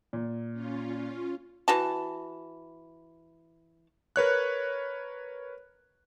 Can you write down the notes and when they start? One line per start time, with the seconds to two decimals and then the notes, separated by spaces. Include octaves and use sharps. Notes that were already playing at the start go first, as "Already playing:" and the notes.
0.13 A#2
0.52 C#4 F4
1.68 E3 F#4 A5
4.16 A#4 B4 C#5 F#6